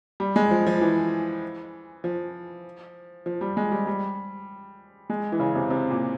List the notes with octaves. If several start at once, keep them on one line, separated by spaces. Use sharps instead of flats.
G3
G#3
F3
F3
E3
F3
F3
G3
G#3
G3
G3
G#3
E3
C#3
C3
C3
A#2